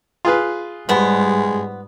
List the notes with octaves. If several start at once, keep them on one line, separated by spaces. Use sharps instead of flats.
F4 G#4 B4
G#2 F3 G3 G#3 B3